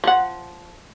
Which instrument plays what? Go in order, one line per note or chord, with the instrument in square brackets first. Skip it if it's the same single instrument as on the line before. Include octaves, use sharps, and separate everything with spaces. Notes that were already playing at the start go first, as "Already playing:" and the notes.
[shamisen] F3 F#5